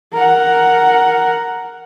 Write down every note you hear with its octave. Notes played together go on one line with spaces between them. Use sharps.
A#4 F#5